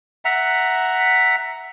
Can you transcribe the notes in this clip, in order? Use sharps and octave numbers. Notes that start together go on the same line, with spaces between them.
E5 F#5 A#5